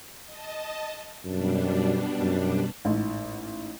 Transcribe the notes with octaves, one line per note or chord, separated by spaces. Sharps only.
D#5 A5
F#2 B2 G3 D4
F#2
A1 G#2